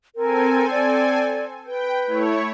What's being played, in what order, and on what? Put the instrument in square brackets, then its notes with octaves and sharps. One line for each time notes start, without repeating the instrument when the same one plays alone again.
[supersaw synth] C4 A4 G#5 [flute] A#4
[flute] D5
[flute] B4 [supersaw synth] G5
[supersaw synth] A3 E4 C#5